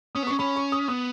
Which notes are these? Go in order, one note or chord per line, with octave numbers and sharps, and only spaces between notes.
C#4 D#6
B3
C#4 C#6
C#4 B5
C#6
D#6
B3 D#6